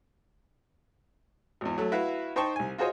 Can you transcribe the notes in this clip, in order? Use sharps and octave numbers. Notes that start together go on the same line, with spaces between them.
G#1 E2
F#3 A3
E4 F#4 B4 F5
D#4 C5 G5 A5 C#6
C2 G#5
F4 F#4 G#4 C5 C#5 D#5